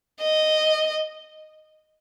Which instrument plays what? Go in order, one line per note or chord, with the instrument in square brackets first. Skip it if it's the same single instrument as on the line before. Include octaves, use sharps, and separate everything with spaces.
[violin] D#5